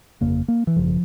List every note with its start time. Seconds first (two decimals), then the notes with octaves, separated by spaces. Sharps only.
0.21 G1 F2 C#3 A#3
0.48 A#3
0.67 E3
0.76 G#1 F#2 C#3 F3